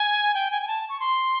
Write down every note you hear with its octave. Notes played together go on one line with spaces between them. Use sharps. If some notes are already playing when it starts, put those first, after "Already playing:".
Already playing: G#5
G5
G#5
G#5
A5
C#6
C6